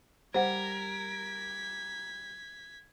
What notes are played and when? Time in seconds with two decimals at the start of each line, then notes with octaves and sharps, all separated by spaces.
0.34 G3 A#4 C5 F#5 G#6 B6